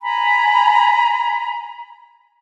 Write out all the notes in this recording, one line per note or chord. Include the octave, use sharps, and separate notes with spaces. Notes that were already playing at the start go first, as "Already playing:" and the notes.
G#5 A#5 B5